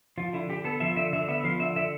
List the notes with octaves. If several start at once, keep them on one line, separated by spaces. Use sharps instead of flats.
F3 F4
D3 E4
D3 G4
B3 A4
F3 E5
D3 E5
D3 E5
B3 E5
F3 F5
D3 E5
D3 E5